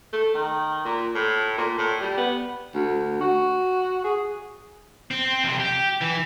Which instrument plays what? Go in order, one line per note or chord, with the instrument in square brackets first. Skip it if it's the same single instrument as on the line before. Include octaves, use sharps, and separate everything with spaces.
[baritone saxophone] A3
D#3
A#2
A2
A#2
A2
G3
B3
D2
F#4
G#4
[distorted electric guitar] C4
F2 C3
G4
E3